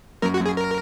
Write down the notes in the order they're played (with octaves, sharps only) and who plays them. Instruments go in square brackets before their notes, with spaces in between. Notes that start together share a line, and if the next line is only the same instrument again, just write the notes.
[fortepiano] F#2 [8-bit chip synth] A#4
[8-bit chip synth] F#4
[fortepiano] F#2
[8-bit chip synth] G#4
A#4